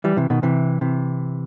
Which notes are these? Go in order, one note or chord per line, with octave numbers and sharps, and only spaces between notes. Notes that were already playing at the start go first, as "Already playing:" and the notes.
E3 G3
C3 E3
B2 D#3
C3 E3
C3 E3